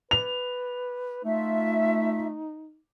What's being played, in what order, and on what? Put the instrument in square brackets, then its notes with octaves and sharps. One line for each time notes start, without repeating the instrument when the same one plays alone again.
[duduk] B4 [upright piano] F7
[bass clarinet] A3 [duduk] D#4 [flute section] F4 E5